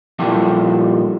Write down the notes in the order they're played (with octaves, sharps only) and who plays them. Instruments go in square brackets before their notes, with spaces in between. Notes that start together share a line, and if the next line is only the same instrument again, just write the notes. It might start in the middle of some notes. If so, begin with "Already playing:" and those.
[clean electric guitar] A#2 F3 G3 E4 G4 A4